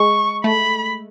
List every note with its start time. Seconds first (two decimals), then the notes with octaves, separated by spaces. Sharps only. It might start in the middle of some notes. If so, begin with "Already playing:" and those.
Already playing: G#3 C#6
0.44 A3 B5